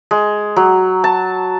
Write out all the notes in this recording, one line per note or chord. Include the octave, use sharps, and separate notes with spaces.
G#3
F#3
A5